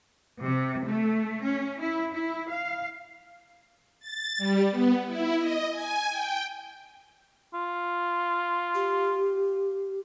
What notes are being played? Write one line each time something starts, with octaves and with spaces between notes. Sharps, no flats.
C3
A3
C#4
E4
E4
F5
A6
G3
B3
E4
D#5
G#5
G5
F4
G4